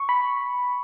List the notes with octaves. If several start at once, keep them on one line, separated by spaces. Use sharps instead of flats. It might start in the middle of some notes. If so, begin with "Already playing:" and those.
Already playing: C#6
B5